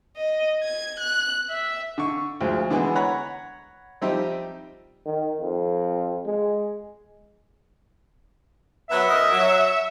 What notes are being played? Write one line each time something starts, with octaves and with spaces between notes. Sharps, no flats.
D#5
G#6
F#6
E5
D3 C#6
D2 F3 G#3
D3 E3 G#3 B3
C#5 F#5 A#5 B5
F3 G3 C4 D#4 G4 E5
D#3
F2
G#3
F#3 B3 E5
F#2 A#4 D#5
F#3